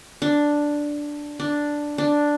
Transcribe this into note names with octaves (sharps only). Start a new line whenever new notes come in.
D4
D4
D4